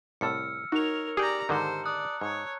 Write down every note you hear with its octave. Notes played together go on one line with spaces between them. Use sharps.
C2 A2 A4 E6 F6 C#7
D#4 F#4 A#4 C#5 F7
G4 G#4 D5 G5 A#5
G#2 D3 D#3 C5 A5 A#5 C#7
D5 D#6 F#6
G#2 C#5